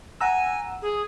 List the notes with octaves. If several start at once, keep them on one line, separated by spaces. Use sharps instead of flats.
F#5 G#5 A#5 E6
G#4